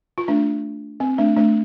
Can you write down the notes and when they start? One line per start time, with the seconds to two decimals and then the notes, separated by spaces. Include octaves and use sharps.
0.18 F4
0.28 A3 D4
1.00 C4
1.18 A3 D4
1.36 A3 D4